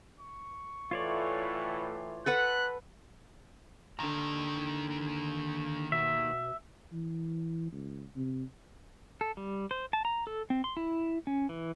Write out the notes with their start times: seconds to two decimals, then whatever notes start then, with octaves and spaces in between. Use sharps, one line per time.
0.20 C#6
0.91 A2 E3 F4 C#5 D5
2.26 A4 B4 F#5 F#6
3.99 D#2 D3 D#3 A#5
5.92 B2 E5
6.92 E3
7.72 C#2
8.16 C3
9.21 A4
9.37 G3
9.71 C5
9.93 A5
10.05 A#5
10.27 A4
10.50 C4
10.64 C6
10.77 E4
11.27 C#4
11.49 E3